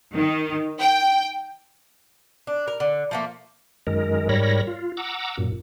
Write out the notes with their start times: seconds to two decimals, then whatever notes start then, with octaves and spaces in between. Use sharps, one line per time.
0.13 D#3
0.79 G5
2.47 D4
2.67 A#4
2.80 D3
3.11 F3 A3 A#3
3.87 F#2 D#3 G#3 A#4
4.29 G#2 G3 A#4 C#5 B5 A#6
4.67 F4
4.97 F#5 A#5 D6 E6
5.37 F#2 A#2